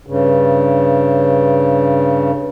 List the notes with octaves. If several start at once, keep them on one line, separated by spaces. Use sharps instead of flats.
G2 C#3